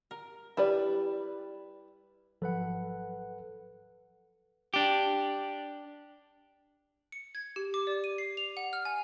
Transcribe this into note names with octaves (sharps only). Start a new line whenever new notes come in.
A#4
G3 E4 B4 D5
G#1 F3 F#3 A4 B4 F#5
D4 G4
C#7
G#6
G4
D6
D5
D#7
C7
F7
F#5
F6
G#5